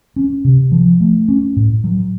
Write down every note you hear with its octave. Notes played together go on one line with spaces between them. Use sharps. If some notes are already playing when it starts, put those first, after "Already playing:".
C#4
C3
F3
A3
C#4
A2
F#3